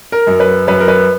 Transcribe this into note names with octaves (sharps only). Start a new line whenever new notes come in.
A#4
F#2
B4
F#2 B4
A#4
B4